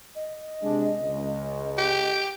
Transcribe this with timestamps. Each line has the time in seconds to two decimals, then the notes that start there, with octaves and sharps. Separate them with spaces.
0.15 D#5
0.63 C3 G#3 D4
1.01 C#2
1.78 G4